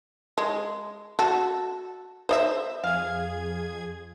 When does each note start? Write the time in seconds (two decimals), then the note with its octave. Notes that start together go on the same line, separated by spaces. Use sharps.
0.38 G#3
1.19 F#4 A4
2.29 C5 D5 E5
2.84 F2 G#4 F5 G#6